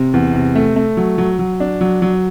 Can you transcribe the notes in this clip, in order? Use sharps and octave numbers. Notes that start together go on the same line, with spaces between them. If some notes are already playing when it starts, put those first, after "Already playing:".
Already playing: C3
E2
C3
A3
A3
F#3
F#3
F#3
D4
F#3
F#3